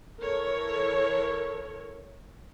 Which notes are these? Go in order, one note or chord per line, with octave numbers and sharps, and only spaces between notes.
E3 A4 A#4 C#5